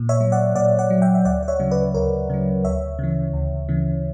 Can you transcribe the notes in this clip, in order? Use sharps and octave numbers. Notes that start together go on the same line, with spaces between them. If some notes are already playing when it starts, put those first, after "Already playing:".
Already playing: A#2
C#5 E5
F#3
D5 F#5
A#2 D5 F#5
D5 F#5
F#3
E5 G5
E5
D2 D5 F#5
D5
C#5 E5
C#3 F#3
B4 D5
D2 A#4 C#5
C#3 F#3
D2 C#5 E5
C#3 E3
D2
C#3 E3